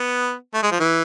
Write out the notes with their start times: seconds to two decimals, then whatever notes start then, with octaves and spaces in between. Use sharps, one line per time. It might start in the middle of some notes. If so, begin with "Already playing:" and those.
Already playing: B3
0.54 A3
0.63 G#3
0.72 F3
0.80 E3